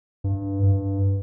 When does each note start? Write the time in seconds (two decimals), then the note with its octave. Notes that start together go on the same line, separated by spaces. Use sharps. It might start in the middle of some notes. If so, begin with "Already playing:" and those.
0.24 G2
0.63 G2